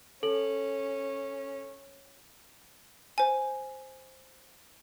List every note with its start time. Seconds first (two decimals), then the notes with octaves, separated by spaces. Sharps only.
0.23 C#4 A4 F#7
3.18 C5 G#5